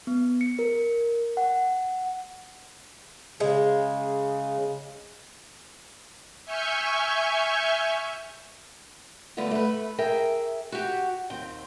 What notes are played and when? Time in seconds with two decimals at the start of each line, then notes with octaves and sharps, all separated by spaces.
0.07 B3
0.41 C#7
0.59 A#4
1.37 F#5
3.40 C#3 G#3
6.46 E5 G#5 C#6 F6 G6
9.37 D3 G3 A3 B3 F4
9.51 A3 B4
9.98 G#4 A#4 E5 G5
10.72 F#4 G4
11.30 D#2 C4 G5